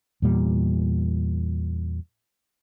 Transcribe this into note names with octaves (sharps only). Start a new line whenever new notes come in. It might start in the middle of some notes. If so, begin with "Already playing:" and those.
E2 A#2 G3